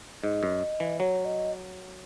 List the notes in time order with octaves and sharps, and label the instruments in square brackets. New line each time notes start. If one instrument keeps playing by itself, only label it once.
[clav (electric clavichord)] G#2 [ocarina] D#5
[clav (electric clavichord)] F#2
E3
[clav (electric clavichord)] F#3 [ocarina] C#5
[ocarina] D#5